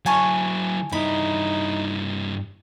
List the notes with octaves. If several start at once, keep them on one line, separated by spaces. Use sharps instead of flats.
F#3 E4 G#5 A5 C#6
G2 D#4 E4 B5